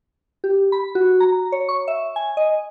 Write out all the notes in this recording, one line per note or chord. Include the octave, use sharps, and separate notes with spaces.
G4
B5
F#4
A#5
C#5
C#6
E5
G#5
D#5